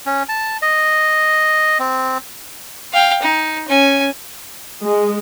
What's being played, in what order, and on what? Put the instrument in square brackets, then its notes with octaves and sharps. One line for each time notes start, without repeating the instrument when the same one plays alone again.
[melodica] C#4
A5
D#5
C4
[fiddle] F5 G5
D#4
C#4 G#5
[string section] G#3